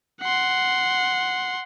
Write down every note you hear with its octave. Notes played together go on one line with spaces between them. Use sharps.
F#5 C6